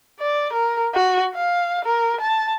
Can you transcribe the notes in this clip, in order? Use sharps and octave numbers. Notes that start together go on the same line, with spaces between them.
D5
A#4
F#4
F5
A#4
A5